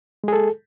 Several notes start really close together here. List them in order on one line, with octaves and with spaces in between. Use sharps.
G#3 G#4 A4